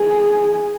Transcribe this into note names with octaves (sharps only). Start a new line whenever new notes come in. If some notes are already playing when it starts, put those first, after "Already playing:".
Already playing: G#4